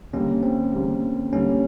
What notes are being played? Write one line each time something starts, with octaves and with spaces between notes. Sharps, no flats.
D#2 D3 G3 A#3 C#4
C4
D#2 D3 G3 A#3
D#2 D3 G3 A#3 C#4